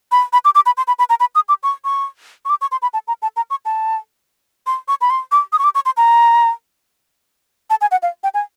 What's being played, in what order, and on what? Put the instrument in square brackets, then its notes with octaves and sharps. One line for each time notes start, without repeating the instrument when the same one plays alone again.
[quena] B5
B5
D6
D6
B5
C6
B5
B5
A#5
B5
D#6
D6
C#6
C#6
C#6
D6
C#6
C6
B5
A5
A#5
A5
A#5
C#6
A5
C6
C#6
B5
C6
D6
D#6
C#6
D6
C#6
C6
A#5
A5
G#5
F#5
F5
G5
G#5